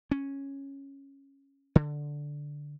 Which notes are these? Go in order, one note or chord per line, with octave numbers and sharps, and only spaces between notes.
C#4
D3